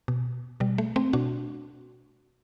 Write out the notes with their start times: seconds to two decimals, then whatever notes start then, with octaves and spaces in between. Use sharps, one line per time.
0.08 B2
0.60 B2 G3
0.78 A3
0.96 A3 C4
1.13 B2 D4 F#4